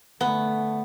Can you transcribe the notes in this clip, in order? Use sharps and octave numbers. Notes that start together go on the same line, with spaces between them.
D3 A3 B3